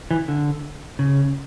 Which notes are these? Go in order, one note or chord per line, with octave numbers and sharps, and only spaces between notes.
E3
D3
C#3